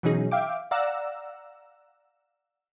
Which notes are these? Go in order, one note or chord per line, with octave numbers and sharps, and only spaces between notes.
B2 E3 F#3 C#4 D#4 G#4
E5 F5 G5 D6
D5 F5 F#5 A#5 E6